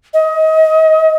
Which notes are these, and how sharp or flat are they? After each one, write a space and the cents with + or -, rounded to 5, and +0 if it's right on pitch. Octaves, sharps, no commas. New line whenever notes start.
D#5 +30